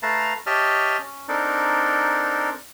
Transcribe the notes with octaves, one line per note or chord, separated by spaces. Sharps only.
A3 B4 F5 A5 A#5
G4 C#5 D#5 E5 A5 F6
C#4
C4 D4 D#4 A4 A#4 D5